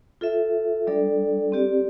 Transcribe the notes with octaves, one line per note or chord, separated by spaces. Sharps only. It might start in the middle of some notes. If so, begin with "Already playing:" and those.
F4 A4 E5
G3 D4 A4 D5
C4 G4 D5